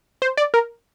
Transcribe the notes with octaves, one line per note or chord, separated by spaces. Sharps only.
C5
D5
A#4